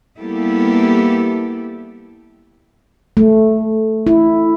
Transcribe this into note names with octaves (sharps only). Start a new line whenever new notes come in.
G3 A#3 B3 E4 G4 A4
A3
E4